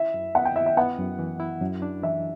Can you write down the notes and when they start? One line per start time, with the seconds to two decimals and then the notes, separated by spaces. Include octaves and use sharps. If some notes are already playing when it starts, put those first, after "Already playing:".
Already playing: E4 E5
0.14 F#2
0.35 B3 F#5
0.45 G5
0.56 E4 E5
0.66 E5
0.77 B3 F#5
0.98 F#2
1.19 E3
1.40 E4
1.61 F#2
1.82 D4
2.03 E3 E5